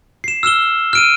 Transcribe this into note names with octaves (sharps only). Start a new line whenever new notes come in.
C7 E7
E6 F6 E7 G7
F6 D7 D#7